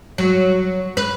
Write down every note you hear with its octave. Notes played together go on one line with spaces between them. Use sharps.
F#3
B4